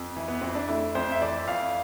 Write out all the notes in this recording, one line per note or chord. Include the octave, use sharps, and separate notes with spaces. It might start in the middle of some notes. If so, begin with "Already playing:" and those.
Already playing: F2
E3
B3
F2 C4
D4
A3 E4
F2 C5
E5
E3 D5
F2 F5